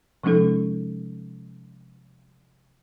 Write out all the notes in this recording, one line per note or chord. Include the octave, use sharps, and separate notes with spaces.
C3 F3 G#3 C#4 D#4 A4